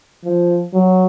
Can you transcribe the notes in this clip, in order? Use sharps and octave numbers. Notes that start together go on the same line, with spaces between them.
F3
F#3